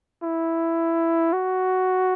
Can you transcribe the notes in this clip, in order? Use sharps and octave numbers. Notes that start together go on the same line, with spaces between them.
E4
F#4